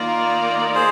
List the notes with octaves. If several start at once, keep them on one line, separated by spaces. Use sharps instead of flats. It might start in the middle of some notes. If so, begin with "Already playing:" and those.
Already playing: D#3 A#3 D#4 F4 A#4 D5
G#4 C5